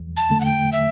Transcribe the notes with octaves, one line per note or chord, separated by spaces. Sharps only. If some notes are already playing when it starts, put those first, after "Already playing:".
Already playing: E2
A5
D3 A3
F#5
G5
E5